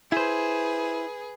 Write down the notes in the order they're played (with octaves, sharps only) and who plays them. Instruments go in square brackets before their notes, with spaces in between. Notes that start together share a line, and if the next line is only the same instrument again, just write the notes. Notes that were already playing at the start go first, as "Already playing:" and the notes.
[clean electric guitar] E4 C5 [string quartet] G#4 B4